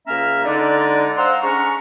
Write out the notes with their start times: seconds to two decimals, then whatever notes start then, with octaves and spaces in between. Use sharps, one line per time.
0.07 C#2 A#3 C#4 E5 A#5 F6
0.45 D3 G#3 D4 D#4 D5
1.17 C5 F5 F#5 A#5 C6 E6
1.42 G#3 C#4 D4 A#5 C#6